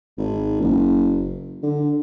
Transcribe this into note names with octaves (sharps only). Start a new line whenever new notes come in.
G#1
F#1
D3